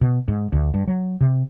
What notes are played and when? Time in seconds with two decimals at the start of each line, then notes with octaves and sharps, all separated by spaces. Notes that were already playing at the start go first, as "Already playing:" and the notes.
0.01 B2
0.28 G#2
0.52 D2
0.74 G2
0.88 F#3
1.21 C3